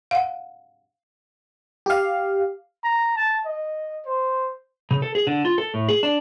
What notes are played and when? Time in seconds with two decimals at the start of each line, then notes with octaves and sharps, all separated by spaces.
0.11 F5 F#5
1.86 G4 F5
2.84 A#5
3.16 A5
3.45 D#5
4.06 C5
4.91 C#3
5.02 A4
5.15 G#4
5.27 D3
5.45 F4
5.58 A4
5.74 A2
5.89 G#4
6.03 D4